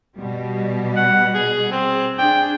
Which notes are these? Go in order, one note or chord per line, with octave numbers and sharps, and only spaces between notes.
B2 G3
F#5
G#4
C4
D4 G#4 G5